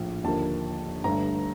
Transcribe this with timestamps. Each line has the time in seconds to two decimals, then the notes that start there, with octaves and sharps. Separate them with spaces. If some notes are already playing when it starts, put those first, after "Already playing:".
Already playing: A#1 A2 F3
0.24 D#2 D3 F3 A#3 A5
1.04 G1 G2 D3 A3 A#5